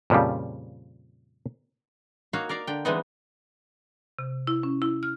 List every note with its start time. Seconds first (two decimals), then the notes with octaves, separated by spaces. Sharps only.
0.10 F2 A#2 C#3 F3 G3
2.33 A#3 D#4 F#4 C#5 F5
2.49 A#4 D5 F5 A#5
2.67 D3 G5
2.85 E3 G3 G#3 B3 C4 D#4
4.19 C3
4.47 E4
4.63 C#4
4.82 E4
5.03 F6